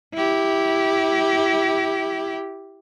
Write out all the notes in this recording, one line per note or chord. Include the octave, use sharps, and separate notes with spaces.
E4 G4